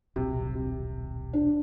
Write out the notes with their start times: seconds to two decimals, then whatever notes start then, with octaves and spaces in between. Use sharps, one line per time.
0.16 D#1 B1 C3
0.55 C3
1.33 D4